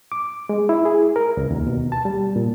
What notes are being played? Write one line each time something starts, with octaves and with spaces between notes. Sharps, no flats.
D6
G#3
E4
G#4
A#4
C#2
D#2
B2
A5
G3
A#2